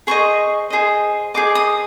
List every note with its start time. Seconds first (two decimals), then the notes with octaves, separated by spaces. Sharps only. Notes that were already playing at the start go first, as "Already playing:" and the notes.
0.07 G#4 C5 D#5 C#6
0.70 G#4 C5 D#5
1.34 G#4 C5 D#5 D6
1.55 D#6